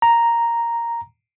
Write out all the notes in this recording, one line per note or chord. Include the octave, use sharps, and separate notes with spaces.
A#5